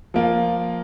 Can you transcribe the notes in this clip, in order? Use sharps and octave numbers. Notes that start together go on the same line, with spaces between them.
F3 A#3 F4